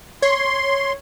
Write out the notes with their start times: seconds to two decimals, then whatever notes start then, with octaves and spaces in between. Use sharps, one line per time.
0.22 C#5 C6